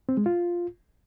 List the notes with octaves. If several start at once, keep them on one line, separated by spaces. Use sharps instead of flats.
C4
G#3
F4